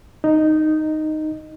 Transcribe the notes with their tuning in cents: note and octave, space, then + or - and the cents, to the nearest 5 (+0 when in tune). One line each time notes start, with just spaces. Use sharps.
D#4 -5